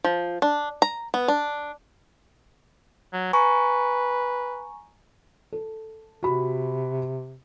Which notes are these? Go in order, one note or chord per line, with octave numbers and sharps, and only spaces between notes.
F3
D4
A#5
B3
D4
F#3
B4 G#5 A#5 C#6
A4
C3 F#4 B5